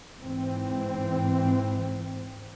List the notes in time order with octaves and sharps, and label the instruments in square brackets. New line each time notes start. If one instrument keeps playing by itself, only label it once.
[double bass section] G#2 E3 C4